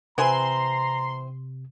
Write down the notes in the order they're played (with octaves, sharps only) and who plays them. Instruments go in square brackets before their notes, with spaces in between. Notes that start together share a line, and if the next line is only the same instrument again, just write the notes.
[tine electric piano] C3 [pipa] E3 C4 G#5 [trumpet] A#5 [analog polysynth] C6